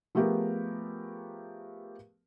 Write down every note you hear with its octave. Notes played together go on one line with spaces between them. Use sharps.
F3 A3 B3 G4 G#4 A#4